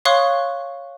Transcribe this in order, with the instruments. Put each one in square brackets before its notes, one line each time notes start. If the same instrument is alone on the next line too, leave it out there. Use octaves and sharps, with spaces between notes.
[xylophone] C#5 F5 C6 C#6 D#6 F#6